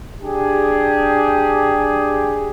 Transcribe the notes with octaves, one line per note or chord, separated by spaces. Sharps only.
D4 G4 G#4